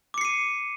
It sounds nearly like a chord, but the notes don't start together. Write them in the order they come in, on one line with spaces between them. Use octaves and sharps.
D6 C#7 C7 D#7